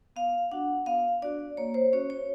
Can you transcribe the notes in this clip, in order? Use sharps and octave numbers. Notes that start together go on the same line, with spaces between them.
B3 F5
D4 F#4 F#5
B3 F5
D4 F#4 D5
A#3 C#5
C5
C#4 F#4 C#5
C#5